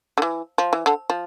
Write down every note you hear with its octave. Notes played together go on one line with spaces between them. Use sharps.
D3
E3
F3
E3
D3
F3